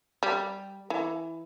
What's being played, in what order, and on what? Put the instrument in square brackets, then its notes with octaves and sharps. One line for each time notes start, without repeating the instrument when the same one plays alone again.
[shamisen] G3
E3